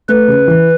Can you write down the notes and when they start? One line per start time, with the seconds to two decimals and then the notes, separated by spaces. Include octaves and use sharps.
0.09 A3 B4
0.28 C#3
0.48 E3